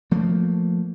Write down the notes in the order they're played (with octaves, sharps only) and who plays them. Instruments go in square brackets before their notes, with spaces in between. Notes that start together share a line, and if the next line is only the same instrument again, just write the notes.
[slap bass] F3 A3 A#3